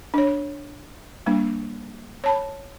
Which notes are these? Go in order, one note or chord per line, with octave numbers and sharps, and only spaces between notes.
D4 C#5
G3 A#3 D4
C#5 A5 B5